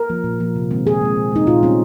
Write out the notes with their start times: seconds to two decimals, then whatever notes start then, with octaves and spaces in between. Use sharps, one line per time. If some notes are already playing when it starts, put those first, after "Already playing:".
Already playing: A#4
0.09 F3 A#3
0.24 A#2
0.40 F3 A#3
0.56 C3
0.71 D#3 G#3 C4
0.86 A#2 G#4
1.01 G#3 C4
1.16 A#2
1.32 G#3 C4 D#4
1.47 A#2 F4
1.63 G3 C4 C#4